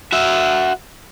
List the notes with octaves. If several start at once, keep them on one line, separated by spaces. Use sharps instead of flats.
F#4 E5